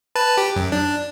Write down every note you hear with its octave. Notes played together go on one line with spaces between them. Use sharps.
B4 A5
G4
F#2
D4